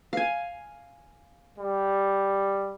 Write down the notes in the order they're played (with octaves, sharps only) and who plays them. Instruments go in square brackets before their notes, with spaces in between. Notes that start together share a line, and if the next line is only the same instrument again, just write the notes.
[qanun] F5 G#5
[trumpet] G3